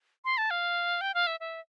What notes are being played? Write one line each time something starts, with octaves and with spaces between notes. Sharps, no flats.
C6
A5
F5
G5
F5
E5
E5